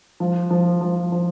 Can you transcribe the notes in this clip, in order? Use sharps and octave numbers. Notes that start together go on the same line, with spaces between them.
F3
F3
F3
F3